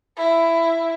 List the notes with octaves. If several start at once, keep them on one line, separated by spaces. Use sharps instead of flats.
E4